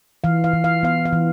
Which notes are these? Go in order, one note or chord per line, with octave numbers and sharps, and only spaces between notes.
E3 F5
F5
E3
F5
B3 F5
F5
E3